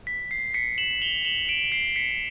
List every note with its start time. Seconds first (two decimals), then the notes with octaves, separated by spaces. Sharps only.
0.07 B6
0.31 C7
0.54 B6 C#7
0.78 E7 F#7
1.02 F7 G7
1.25 E7 F#7
1.49 D7 E7
1.72 C7
1.96 B6 C#7